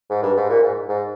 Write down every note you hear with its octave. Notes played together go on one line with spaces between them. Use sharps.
G#2
G2
G#2
A#2
G#2
G#2